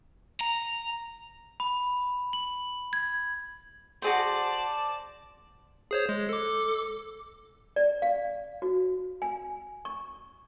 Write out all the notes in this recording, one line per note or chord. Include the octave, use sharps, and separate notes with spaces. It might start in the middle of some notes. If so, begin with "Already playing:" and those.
A#5
B5
F#7
G#6
F#4 G#4 C5 D5 A5
G#4 C5 C#5
G#3
A4 D6
D5
F5
F#4
G#5
C#6